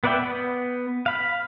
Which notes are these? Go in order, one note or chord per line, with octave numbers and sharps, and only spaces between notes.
B3 B4 D5 E5 G5
B3
F5 B5